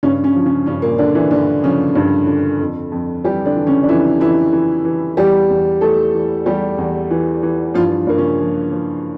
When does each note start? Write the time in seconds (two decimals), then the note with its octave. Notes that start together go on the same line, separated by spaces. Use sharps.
0.03 G2 C#3 C#4
0.23 C#3 C#4
0.35 F3
0.46 C#3 C#4
0.66 G2 C#3 C#4
0.82 A#2 A#3
0.98 D3 D4
1.15 E3 E4
1.31 G2 D3 D4
1.63 C#3 F3 C#4
1.95 G2
2.27 D3
2.60 F2
2.92 F2
3.24 E3 G3 G4
3.45 D3 D4
3.56 E3
3.67 C#3 C#4
3.83 D4
3.88 F2 E3 E4
4.20 F2 E3 E4
4.52 E3
4.84 E3
5.17 E2 G3 G4
5.50 E2
5.81 E3 A3 A4
6.14 E3
6.46 E2 G3 G4
6.78 E2
7.11 E3
7.43 E3
7.74 G2 F3 F4
8.07 G2 A#3
8.17 C#3 C#4
8.39 F3
8.72 F3